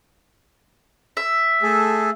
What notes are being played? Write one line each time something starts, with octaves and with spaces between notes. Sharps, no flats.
E5
A3 G#4 A4